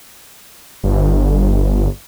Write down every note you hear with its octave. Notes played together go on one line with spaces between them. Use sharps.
G1